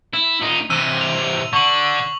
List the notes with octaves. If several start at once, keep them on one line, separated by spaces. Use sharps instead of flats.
E4
A#2 D#4
C3 E3 E6 D#7
F7
D3 C#6 F#7